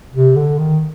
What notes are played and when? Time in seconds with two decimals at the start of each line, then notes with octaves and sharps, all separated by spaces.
0.13 C3
0.36 D3
0.59 D#3